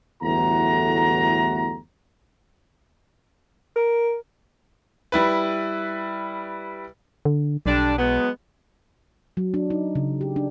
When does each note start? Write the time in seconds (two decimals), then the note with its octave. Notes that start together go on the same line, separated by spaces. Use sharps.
0.22 G1 E2 A2 A3 F#4 A#5
3.76 A#4
5.12 G3 E4 B4
7.25 D3
7.66 B1 D3 G3 D4
7.98 F#3 G#3 B3
9.37 F#3
9.54 D4
9.70 D#4
9.95 C#3
10.21 G4
10.36 D4